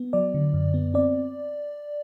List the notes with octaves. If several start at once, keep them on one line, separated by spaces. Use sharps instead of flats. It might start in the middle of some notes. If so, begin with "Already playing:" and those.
Already playing: B3
F#3 D5
D3
F#2
B3
C4 D5